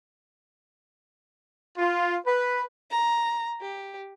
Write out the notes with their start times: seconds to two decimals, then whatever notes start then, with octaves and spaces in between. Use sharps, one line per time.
1.78 F4
2.26 B4
2.90 A#5
3.61 G4